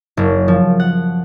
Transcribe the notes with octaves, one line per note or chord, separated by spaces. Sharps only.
F#1
F3
F#5